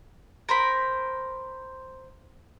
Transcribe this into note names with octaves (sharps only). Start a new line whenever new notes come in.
A#4 C5 B5